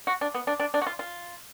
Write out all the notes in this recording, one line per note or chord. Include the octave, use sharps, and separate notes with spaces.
F#4
D4
B3
D4
D4
D4
F#4
F4
F4